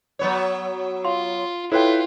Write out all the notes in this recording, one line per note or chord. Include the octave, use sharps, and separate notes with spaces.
F#3 B3 C#5
F4 F5 C6
E4 F4 A4 B4 C#5 G5